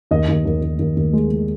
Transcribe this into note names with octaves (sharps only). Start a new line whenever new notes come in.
D#2 D#5
D#2
D#2
D#2
D#2
D#2
G#3
G#3